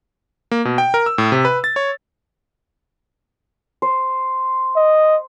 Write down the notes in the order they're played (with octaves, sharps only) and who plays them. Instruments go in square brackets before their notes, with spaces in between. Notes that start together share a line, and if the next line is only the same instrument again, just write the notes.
[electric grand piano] A#3
B2
G5
A#4
E6
A2
C3
B4
A6
C#5
[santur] C5
[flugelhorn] D#5